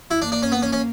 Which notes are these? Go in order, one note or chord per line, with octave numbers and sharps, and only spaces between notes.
E4
A#3 D4
D4
C#4
B3
C#4
C#4